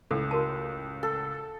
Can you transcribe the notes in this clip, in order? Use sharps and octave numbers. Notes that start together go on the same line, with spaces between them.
C#2 A2 A4
F#4 A#4 A5
A4